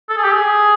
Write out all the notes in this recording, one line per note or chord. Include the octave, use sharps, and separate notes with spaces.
A4
G#4
G4
G#4